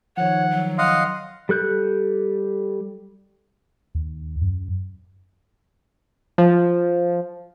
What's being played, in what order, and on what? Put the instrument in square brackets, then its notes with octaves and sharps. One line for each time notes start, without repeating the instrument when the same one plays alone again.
[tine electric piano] D#3 F3 [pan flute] C#5 [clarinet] F#5
[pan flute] F#3
[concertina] D#5 F5 F#5 [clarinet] C6
[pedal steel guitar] G3 A4 F#6 G6
[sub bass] D#2
F#2
[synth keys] F3